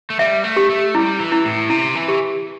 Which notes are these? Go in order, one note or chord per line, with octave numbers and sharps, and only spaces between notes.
A3
G3 E5
A3
G4
A3
G3 E4
E3
E4
A2
C3 E4
E3
G4